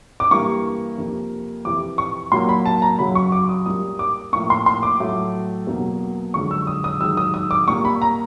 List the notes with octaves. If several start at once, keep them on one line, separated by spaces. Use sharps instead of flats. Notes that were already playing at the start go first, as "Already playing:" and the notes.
D6
G2 E3 G3 A#3 C#6
F2 C3 F3 A#3
F2 C3 E3 D6
C#6
A#2 F#3 A#3 C6
B5
A5
A#5
F#2 C#3 F#3 B5
C#6
D6
D#6
A#2 G3 A#3 D#6
D6
A2 F3 A#3 C#6
C6
C6
D6
A2 F#3 A3
E2 B2 F#3 A#3
F#2 D3 F3 G#3 C#6
E6
D#6
D#6
F#2 D#3 G#3 E6
D#6
D#6
D6
A#2 G3 A#3 C#6
B5
A#5